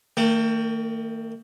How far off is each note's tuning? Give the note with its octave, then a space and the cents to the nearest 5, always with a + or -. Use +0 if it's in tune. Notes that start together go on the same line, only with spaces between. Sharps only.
D#3 +0 A3 +45